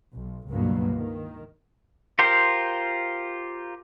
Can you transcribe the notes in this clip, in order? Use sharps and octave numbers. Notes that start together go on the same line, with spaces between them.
B1
C#2 G2 B2 F#3 A#3 B3
D#3
F4 G4 A#4 C5